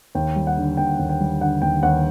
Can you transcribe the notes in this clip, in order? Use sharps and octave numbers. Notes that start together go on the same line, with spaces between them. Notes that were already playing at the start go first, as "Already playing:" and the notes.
D#2 G5
G3
F#5
D3
D#2 G5
D#2
G5
G3
D3 F#5
D#2 G5
D#2 F#5